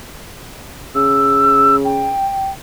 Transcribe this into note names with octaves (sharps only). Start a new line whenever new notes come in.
C#3 E6
G5